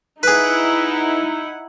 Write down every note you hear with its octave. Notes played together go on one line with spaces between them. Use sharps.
D#4 E4 G#4 B4 F#5